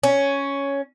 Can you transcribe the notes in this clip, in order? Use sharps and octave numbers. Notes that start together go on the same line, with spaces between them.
C#4